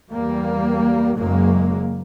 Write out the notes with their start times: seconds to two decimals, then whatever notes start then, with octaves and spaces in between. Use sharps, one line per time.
0.11 E2 G3 A#3
1.17 F#1 F#2 C#3 F#3 G#3 A#3